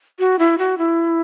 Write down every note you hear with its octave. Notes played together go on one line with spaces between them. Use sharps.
F#4
E4
F#4
E4